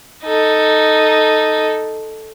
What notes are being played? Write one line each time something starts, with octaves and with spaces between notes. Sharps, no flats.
D#4 A4